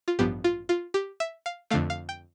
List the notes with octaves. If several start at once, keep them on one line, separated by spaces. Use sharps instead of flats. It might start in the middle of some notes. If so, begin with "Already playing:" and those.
F4
A1 G2 F3 B3 G4
F4
F4
G4
E5
F5
F2 D3 A3 F5
F5
G5